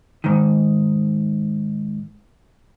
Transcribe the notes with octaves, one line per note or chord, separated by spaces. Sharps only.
G#2 D#3